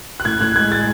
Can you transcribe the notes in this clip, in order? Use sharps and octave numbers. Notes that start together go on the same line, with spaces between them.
F#6
A2 G#6
A2 F#6
G#3 G#6
G#3 A6